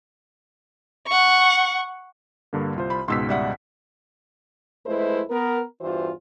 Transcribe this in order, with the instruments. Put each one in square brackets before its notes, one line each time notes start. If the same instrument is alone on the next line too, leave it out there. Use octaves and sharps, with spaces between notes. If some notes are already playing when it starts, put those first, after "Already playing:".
[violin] F#5 C#6
[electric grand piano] G2 D3 A#3
C2 F4 C5
[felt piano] B5
[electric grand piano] C#2 G#2 B2 [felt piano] C6 E6 B6
[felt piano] G3 E5 F#5
[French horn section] F2 G#3 A3 E4 B4 C5
B3 A#4
E2 G2 E3 F4 F#4 C5